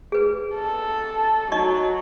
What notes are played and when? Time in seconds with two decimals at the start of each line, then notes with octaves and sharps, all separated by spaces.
0.12 G#4 B4
0.55 A4
1.52 F#3 D#4 D#5 C#6